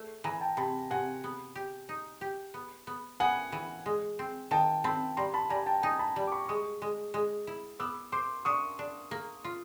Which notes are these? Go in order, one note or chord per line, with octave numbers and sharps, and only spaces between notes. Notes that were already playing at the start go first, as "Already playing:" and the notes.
Already playing: A3
E3 G#5 A#5
G5 A5
C3 A5 B5
C3 F#5 G#5
B3
G4
D#4
G4
B3
B3
B3 F#5 G#5
E3
G#3
C4
D#3 G5 A5
C4 A5 B5
G3 A#5 C6
A5 B5
G3 G#5 A#5
G5 A5
D#4 G#5 A#5
A5 B5
G3
D6
B5 C#6
G#3 C#6 D#6
G#3
G#3
E4
B3 D6 E6
C5 C6 D6
D4 C#6 D#6
D4
A#3
F4